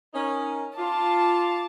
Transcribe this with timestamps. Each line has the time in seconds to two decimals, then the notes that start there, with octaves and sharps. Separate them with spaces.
0.14 C#4 D#4 A#4
0.78 F4 A5 D6